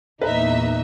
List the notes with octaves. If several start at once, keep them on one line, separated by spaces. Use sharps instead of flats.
E2 A#2 A#3 D#4 B4 E5